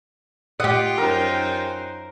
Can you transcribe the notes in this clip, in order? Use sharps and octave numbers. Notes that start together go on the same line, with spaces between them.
F4 G4 D#5 F#5 G5
F#2 D#4 A#4 C5